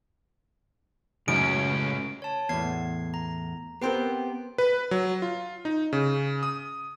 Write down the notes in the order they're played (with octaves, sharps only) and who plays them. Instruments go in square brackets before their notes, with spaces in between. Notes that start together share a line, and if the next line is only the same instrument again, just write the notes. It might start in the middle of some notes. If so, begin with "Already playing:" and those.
[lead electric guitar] C#2 [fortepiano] F#2 [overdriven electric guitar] A2 C#4 [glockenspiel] D7
[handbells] C#5 A5
[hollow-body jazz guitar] E2 A2 [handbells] B3 G#6 C7
[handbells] A#5
[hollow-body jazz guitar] B3 C4 A#4 [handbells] G4 G5 C6
[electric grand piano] B4
F#3
F4
D#4
C#3
D#6